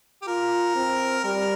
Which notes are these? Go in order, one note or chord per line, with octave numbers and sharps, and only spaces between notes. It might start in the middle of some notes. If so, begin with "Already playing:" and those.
G4
F4 A#4
C4
G3 A#4